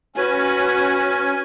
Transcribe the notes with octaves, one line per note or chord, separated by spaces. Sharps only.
C#4 F#4 B4 G#5